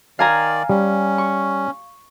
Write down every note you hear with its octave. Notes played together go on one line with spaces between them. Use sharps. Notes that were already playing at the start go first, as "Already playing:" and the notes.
D#3 D5 F5 G#5 A#5
G3 C#4
C#6